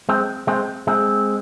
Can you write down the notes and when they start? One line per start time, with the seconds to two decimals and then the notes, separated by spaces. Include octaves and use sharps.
0.09 G#3 C4
0.47 G#3 C4
0.87 G#3 C4